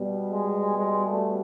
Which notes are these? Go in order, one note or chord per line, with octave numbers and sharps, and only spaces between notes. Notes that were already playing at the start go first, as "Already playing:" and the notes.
Already playing: B2 G3
G#3
G#3
A3